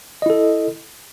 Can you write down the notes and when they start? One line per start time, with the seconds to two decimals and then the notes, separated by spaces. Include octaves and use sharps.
0.22 D#5
0.26 E4
0.30 A4